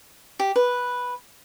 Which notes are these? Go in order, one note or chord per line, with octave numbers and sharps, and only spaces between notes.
G4
B4